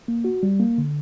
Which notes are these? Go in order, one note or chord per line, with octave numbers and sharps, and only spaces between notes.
A#3
F#4
G3
A#3
D3